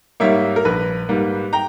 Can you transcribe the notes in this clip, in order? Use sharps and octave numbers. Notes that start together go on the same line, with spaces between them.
G#2 G3 A#3 C#5 E5
A#4
A#1 B4
G#2 G3 A#3
G5 A#5